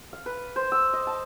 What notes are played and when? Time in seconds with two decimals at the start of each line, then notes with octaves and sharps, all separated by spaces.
0.13 F5
0.26 B4
0.56 C5
0.72 E6
0.93 D#5
1.07 A5